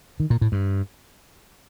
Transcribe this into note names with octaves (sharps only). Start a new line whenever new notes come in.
D#3
A#2
A2
G2